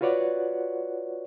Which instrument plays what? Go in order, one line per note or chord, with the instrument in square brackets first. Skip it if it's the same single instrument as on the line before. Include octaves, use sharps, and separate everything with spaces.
[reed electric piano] F4 F#4 B4 C#5 D5 F#5